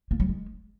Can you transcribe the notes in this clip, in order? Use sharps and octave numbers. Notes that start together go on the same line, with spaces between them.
A#3
F#3
G#3